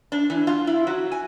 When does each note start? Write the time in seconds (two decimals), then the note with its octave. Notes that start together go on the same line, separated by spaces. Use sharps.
0.12 D4
0.30 E3
0.47 F4
0.67 E4
0.87 F#3
1.12 G#5